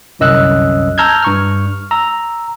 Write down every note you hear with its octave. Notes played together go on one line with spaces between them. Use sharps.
G1 C2 F#2 D#5 E6 F#6
A5 A#5 E6 F6 G6 G#6
G2 C#6 F6
A#5 E6